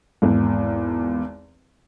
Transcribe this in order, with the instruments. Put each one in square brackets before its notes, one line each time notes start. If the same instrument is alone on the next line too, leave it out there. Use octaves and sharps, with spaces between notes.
[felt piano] G#1 E2